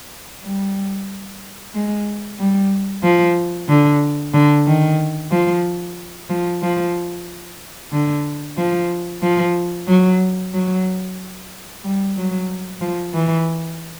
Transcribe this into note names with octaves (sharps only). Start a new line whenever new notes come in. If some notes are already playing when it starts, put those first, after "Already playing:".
G3
G#3
G3
F3
D3
D3
D#3
F3
F3
F3
D3
F3
F3
F#3
F#3
G3
F#3
F3
E3